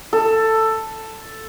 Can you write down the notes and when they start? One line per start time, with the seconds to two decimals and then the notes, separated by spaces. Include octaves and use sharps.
0.13 A4